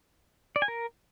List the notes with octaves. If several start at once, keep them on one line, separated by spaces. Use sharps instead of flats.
D5
G#5
A#4